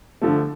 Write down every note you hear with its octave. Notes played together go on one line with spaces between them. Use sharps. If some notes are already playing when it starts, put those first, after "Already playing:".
D3 F3 A3